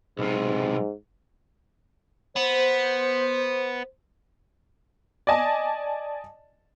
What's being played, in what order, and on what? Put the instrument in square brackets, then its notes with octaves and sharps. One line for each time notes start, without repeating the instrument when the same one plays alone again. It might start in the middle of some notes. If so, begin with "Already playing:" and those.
[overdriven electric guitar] B1 C3 [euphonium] G#2
[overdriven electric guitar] B3 [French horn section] C5
[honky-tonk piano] D5 D#5 G#5 A5